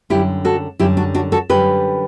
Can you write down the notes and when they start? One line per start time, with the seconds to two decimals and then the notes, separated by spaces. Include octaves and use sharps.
0.10 F#2 D3 G3 E4 G4
0.45 F#4 A4
0.79 F#2 D3 G3 E4 G4
0.97 D4 F#4
1.15 D4 F#4
1.32 F#4 A4
1.50 F#2 D3 G3 G4 B4